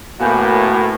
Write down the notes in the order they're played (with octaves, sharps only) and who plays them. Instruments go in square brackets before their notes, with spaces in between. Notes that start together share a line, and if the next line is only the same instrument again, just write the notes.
[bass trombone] A2 [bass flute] A#3 [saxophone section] B3 F#4 [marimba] F5 G#5 G6